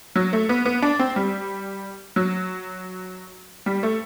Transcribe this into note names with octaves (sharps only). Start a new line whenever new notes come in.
F#3
A3
B3
B3
D4
C4
G3
F#3
G3
A3